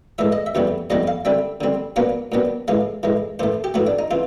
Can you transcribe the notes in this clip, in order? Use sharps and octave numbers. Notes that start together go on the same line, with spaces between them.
A2 E3 G#3 E5
D#5
E5
F2 C3 E3 G3 B3
F2 C3 E3 G3 B3 D#5
F5
D3 G3 C4 E5
D3 G3 C4
A#2 F#3 B3 D4 F5
A#2 F#3 B3 D4
A2 E3 G#3 F5
A2 E3 G#3
A2 E3 A3 C5
G4
A2 E3 A3 F#4
D4
D#4
C3 E3 F4